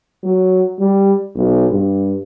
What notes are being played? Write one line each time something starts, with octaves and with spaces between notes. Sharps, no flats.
F#3
G3
B1
G2